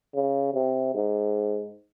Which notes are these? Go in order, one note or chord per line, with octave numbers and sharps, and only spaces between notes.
C#3
C3
G#2